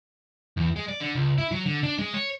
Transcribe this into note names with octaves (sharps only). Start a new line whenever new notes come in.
E2
G#3
D5
D3
C#2
E4
F#3
D3
D4
G#3
C#5